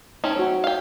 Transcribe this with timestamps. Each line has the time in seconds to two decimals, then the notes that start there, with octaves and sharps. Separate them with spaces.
0.24 A3 C4 C#4 D#4
0.36 F#4 C5 C#5
0.64 F5 G5